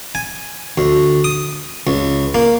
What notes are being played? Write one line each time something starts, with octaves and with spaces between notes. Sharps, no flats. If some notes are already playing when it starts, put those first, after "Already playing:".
G#5
D2
D#6
C#2
A#3